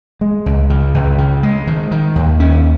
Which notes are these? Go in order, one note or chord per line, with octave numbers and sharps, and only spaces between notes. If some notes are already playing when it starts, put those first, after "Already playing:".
G#3
C#2
C#3
C#2
C#3
G#3
D#3
D#3
D#2
C#4